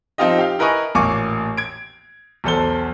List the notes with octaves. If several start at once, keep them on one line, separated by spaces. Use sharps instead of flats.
F3 C4 D#4 F4 G4 D#5
G4 F5
E4 A#4 B4 D#5 G#5 C#6
A1 A#2 A#3 G#5 C#6 D6
G#6 D7
B1 E2 A4 C5 G7